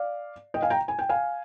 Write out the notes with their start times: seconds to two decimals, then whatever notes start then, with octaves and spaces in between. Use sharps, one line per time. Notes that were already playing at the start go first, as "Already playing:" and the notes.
Already playing: D5 F5
0.54 D#5 G5
0.62 F5 G#5
0.70 G5 A#5
0.88 G#5
0.99 G5
1.09 F5 G#5